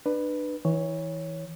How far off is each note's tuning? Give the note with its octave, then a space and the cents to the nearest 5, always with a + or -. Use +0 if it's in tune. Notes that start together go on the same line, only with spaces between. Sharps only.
D4 +30 B4 +0
E3 -25 C#5 +0